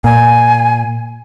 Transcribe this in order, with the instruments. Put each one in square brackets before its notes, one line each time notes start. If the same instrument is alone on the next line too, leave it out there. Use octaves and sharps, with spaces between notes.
[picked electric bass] A#2 [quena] G#5